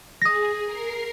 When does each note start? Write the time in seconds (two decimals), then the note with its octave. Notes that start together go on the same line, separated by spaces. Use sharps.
0.22 G#4 D#6 A#6
0.65 A#4 C7